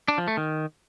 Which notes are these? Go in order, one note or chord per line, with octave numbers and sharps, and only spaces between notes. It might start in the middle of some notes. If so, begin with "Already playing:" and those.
D4
F3
A3
D#3